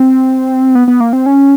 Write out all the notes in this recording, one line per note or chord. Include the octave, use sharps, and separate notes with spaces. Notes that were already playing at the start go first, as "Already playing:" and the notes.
Already playing: C4
B3
B3
A#3
C4
C#4